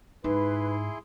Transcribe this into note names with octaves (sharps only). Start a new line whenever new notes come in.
G#2 D#4 E4 G#4 B4 C6